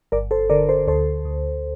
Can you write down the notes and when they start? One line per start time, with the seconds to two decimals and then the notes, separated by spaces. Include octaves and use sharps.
0.12 G1 A#4 D5
0.31 A4 C5
0.50 D3 A#4 D5
0.69 A4 C5
0.87 D2 A4 C5
1.25 D2